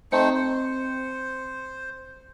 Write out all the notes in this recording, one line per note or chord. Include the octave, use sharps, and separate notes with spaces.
A3 C4 D#4 C5 C#7
C5